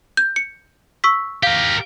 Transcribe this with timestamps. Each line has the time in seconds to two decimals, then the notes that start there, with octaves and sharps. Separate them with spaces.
0.17 G6
0.36 C#7
1.04 C#6 E6 B6
1.43 G4 A#4 F5